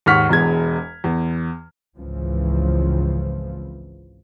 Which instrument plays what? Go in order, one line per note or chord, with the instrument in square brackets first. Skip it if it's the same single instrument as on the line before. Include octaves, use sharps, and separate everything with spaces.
[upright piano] D#2 G#2 F#5 C#6 F6 B6
E1 E2 G#3 G#6
E2
[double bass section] G#1 C#2 C#3 E3 F3